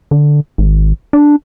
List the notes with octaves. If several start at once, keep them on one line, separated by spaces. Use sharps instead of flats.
D3
G#1
D4